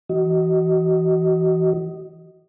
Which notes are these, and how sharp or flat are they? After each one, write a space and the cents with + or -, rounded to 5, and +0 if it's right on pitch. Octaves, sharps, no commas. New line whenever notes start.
E3 +0 F#4 +30 D#5 +10